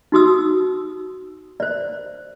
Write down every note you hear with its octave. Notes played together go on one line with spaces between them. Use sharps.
D#4 F#4 D#6 E6
C5 D5